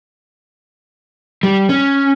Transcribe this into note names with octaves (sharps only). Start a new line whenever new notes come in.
G3
C#4